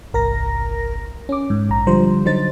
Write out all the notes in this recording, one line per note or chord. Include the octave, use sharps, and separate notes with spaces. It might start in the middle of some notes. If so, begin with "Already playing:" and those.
G1 C2 A#4 A#5 A#6
C#4 D6
G#2
A#1 A#5
D3 F3 G3 F4 C5
D3 F#3 D#4 C5 A6